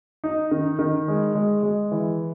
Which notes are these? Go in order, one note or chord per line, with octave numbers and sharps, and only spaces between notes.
D#4
D#3
D#3
G#3
G#3
G#3
E3